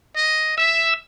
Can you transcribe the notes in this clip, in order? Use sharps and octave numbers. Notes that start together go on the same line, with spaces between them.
D#5
E5 E6